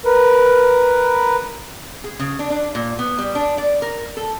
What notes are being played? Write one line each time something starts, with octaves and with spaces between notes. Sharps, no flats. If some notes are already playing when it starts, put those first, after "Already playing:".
A#4 B4
G#4
C#3
D4
D4
A#2
B3
G3
D4
D5
A#4
A4